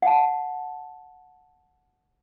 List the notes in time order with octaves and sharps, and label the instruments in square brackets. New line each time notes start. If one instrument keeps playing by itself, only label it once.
[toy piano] F#5 A5